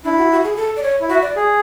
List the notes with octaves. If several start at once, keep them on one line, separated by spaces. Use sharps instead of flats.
D4 E4
F#4
F#4
G#4
A4
D5
C#5
E4
F#4 E5
D5
G#4